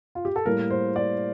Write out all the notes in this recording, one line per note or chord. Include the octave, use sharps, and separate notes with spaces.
F4
G4
A4
A2 G3 A#3 A#4
C5
D5